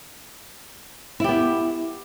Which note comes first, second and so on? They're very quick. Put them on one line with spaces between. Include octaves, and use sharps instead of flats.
E4 G4 B3